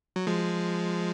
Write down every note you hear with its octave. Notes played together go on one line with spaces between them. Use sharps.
F#3
F3 G#3